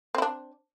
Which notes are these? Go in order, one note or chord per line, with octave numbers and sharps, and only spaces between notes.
C4 D4 E4